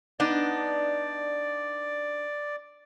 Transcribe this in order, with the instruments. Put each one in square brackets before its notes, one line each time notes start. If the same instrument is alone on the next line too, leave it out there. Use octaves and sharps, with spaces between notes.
[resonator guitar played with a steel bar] B3 D4 D#4 [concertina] D5